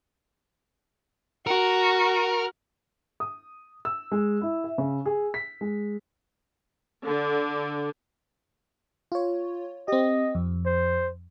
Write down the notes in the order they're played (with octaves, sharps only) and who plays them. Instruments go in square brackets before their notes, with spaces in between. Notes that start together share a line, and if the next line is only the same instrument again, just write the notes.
[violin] F#4 [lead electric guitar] A#4
[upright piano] D#6
E6
G#3
E4
E5
C#3
G#4
B6
G#3
[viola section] D3
[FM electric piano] F4 C#5
[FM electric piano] C4 G4 [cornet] D#5
[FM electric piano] F2
[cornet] C5